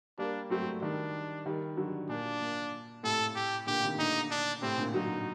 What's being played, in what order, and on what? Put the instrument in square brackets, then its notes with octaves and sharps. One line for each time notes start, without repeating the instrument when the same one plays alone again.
[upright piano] G3 A#3 [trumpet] D4
[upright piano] F#3 A3 [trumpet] C4
[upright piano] D#3 G3 [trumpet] D4
[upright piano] D#3 G3
D3 F#3
[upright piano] A#2 [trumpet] D4
[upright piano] A#2
[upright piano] A2 C3 [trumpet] A4
[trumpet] G4
[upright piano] A#2 D3 [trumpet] G4
[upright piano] C3 D#3
[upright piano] A#2 D3 [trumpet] D#4
[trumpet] D4
[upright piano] A2 C3 [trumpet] C4
[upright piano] A#2 D3
[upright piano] D3 F#3 [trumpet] D#4